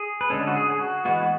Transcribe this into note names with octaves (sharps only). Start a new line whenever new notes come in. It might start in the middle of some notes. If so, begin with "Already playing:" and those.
Already playing: G#4
B4
D3 G#3 C#4 A4
F#4
G#4
G#4
F#4
E3 G#3 B3 F#4